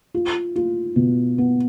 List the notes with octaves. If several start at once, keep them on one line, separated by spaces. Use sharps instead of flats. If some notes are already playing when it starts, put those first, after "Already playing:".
F4
F4
B2
B3